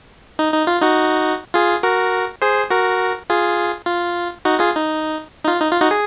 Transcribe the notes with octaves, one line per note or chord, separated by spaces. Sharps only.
D#4
D#4
F4
D#4 F#4
F4 G#4
F#4 A#4
G#4 C5
F#4 A#4
F4 G#4
F4
D#4 F#4
F4 G#4
D#4
D#4
F4
D#4
F4
D#4 F#4
G#4